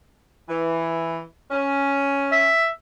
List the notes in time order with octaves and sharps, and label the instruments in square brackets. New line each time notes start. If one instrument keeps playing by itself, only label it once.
[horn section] E3
C#4
[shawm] E5